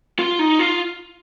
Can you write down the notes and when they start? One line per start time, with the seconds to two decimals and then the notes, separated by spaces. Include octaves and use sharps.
0.19 F4
0.39 D#4
0.59 F4